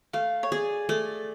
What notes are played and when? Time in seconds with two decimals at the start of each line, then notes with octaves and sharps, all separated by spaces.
0.13 A3 F5
0.43 C#5
0.52 G#4 D5
0.89 A3 D5